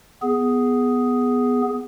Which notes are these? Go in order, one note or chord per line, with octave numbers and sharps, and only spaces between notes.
B3 G#4